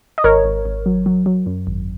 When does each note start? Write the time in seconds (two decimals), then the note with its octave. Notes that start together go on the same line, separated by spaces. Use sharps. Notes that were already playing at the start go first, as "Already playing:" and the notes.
0.18 D#5
0.24 G#1 A#4 C#5
0.44 G#1
0.65 G#1
0.86 F#3
1.06 F#3
1.26 F#3
1.46 F#2
1.67 G#1